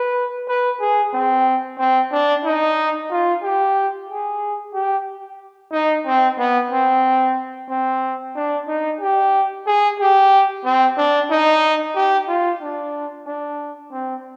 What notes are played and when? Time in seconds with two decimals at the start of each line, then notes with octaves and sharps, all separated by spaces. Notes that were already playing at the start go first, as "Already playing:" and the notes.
Already playing: B4
0.48 B4
0.81 G#4
1.13 C4
1.78 C4
2.12 D4
2.45 D#4
3.11 F4
3.43 G4
4.09 G#4
4.74 G4
5.72 D#4
6.06 C4
6.39 B3
6.71 C4
7.69 C4
8.35 D4
8.68 D#4
9.00 G4
9.66 G#4
9.99 G4
10.64 C4
10.97 D4
11.30 D#4
11.95 G4
12.28 F4
12.61 D4
13.27 D4
13.92 C4